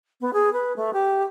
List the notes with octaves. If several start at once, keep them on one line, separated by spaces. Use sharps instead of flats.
B3
G#4
B4
A3
G4